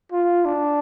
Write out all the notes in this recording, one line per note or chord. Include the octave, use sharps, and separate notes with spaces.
F4
D4